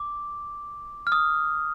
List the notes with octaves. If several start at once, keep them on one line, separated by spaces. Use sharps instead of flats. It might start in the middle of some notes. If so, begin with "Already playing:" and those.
Already playing: D6
F6
D#6